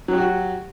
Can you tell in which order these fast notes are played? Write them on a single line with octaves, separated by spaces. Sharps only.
F#3 G4 F#4